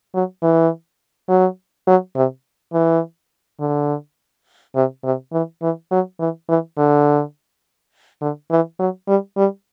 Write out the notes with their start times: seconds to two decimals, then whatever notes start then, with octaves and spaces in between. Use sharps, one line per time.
0.14 F#3
0.42 E3
1.29 F#3
1.87 F#3
2.16 C3
2.73 E3
3.60 D3
4.75 C3
5.04 C3
5.32 E3
5.62 E3
5.91 F#3
6.20 E3
6.49 E3
6.78 D3
8.21 D3
8.51 E3
8.79 F#3
9.08 G3
9.37 G3